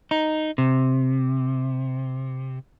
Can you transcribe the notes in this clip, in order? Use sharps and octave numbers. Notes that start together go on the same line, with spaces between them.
D#4
C3